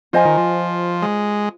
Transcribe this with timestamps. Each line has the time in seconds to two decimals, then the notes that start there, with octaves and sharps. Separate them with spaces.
0.13 F3 F4 C5 D#5 G#5
0.25 D#3
0.37 F3
1.02 G#3